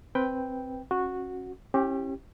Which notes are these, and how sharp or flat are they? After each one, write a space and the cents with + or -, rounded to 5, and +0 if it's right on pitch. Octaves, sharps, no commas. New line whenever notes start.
C4 +0 B4 +0 G5 +0
C#4 -25 F#4 -10
C#4 -40 E4 +0 G4 +0